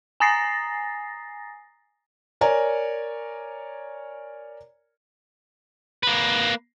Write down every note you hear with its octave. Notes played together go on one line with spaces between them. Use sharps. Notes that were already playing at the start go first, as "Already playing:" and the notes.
G#5 A#5 D#6 A6 A#6 C7
A#4 C#5 D5 G#5 A#5
A#3 B4